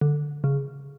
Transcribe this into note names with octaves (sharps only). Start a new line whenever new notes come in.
D3
C#3